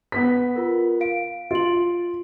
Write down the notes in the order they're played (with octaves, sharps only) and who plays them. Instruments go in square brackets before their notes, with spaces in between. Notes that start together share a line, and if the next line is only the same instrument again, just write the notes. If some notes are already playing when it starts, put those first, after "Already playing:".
[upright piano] B3 B6
[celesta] F4 A#4
F5 D7
[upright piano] F4 [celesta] D7 F#7